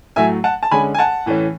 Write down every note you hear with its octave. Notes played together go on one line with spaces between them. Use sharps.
A2 F#3 A3 E5 G#5
F#5 A5
A5
D3 G#3 C#4 G#5 B5
G#5
F#5 A5
A2 E3 A3 C#4